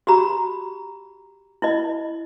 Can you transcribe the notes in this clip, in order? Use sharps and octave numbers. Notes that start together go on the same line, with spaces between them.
F#4 G4 A#5 B5
E4 F4 D#5